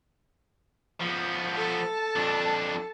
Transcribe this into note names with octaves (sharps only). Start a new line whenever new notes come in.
F3 B3
A4 A5
F2 D4